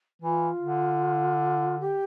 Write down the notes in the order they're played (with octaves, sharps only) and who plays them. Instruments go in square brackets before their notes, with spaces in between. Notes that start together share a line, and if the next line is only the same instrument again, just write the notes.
[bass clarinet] E3 [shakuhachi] F4
[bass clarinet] D3
[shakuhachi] G4